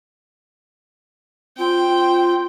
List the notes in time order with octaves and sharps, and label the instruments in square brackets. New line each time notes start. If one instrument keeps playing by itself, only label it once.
[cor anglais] C4 [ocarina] F4 [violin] G5